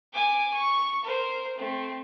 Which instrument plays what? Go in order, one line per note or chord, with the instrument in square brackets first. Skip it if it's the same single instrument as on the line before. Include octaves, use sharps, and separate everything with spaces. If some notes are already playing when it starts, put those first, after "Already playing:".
[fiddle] G#5 D6
C#6
A#4 C5
A3 C4